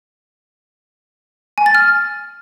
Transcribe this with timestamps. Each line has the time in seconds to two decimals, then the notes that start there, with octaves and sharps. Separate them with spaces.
1.58 G#5
1.66 A6
1.75 F6